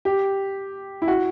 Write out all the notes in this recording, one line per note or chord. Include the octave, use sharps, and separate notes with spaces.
G4
E4
F#4